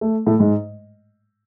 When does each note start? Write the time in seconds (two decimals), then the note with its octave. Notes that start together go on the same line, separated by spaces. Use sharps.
0.01 A3
0.27 A2 A3
0.39 G#2 G#3